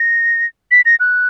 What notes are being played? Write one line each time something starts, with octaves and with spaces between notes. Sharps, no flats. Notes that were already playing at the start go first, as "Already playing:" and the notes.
Already playing: A#6
B6
A#6
F#6